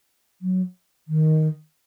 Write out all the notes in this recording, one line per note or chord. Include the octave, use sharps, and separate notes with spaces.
F#3
D#3